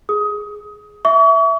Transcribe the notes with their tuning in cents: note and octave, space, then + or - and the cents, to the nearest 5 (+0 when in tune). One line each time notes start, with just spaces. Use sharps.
G#4 +0 D#6 +20
E5 +0 C#6 +40